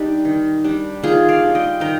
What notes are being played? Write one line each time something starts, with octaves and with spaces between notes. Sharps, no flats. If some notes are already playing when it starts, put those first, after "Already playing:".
Already playing: G3 D4 D#4 G4
D#3
G3 D4
D#3 F4 G#4
D5 F5
G3 D4
D#5 G5
D#3 G5 A#5